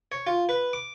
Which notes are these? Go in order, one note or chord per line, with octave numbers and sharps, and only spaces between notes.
C#5
F4
B4
D6